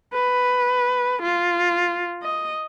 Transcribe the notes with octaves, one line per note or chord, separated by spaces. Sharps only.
B4
F4
D#5